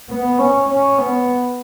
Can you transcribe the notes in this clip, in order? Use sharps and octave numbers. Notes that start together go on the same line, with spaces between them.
B3
C#4
C#4
B3